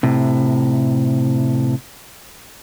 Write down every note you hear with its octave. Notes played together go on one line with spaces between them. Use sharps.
A2 C3